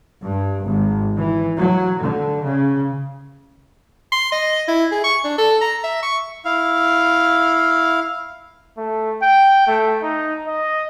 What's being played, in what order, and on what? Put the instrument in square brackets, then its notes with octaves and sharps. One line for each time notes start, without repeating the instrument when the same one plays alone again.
[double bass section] G2
G#1
E3
F#3
D3
C#3
[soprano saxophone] C6
D#5
E4
G#4
C#6
D4
A4
A#5
E5
C#6
[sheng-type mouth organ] E4 F5
[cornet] A3
G5
A3
D#4
D#5